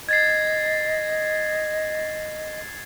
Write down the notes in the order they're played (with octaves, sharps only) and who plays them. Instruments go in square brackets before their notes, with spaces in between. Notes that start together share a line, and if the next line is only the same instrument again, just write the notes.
[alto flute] D#5 [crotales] G#6 A6 C7